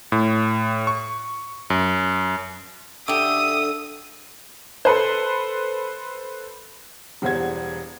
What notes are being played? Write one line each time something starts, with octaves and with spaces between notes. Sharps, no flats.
A2
C#6
F#2
D3 G4 E5 D6 D#6
A4 B4 C5
E1 E2 G3 C5 F#5 G#6